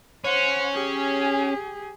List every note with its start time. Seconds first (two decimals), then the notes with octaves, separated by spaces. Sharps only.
0.25 C#4 C5 F#5
0.74 G4 G#4